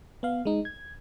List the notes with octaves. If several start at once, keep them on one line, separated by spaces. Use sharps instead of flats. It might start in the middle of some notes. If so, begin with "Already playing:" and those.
B3 F5
G#3 D#4
G#6